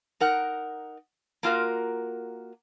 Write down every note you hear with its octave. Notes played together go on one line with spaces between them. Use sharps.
D#4 A#4 F#5
A#3 F4 F#4 A#4